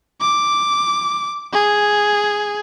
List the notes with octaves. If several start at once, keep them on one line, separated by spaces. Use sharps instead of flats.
D6
G#4